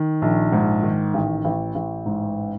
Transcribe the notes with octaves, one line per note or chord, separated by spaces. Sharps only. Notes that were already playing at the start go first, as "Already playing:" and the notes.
Already playing: D#3
A#1
G#2
D#3
A1
A1
A1
G#2